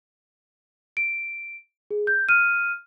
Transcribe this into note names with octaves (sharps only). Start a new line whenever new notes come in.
D7
G#4
G6
F6 D#7